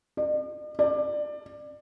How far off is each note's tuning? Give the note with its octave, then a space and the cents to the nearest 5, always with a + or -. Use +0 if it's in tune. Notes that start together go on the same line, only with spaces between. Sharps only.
D5 +45
D5 +20